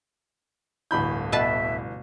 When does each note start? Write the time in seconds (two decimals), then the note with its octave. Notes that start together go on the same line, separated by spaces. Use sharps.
0.91 D1 G1 E3 B5 G6
1.32 B2 B4 E5 A5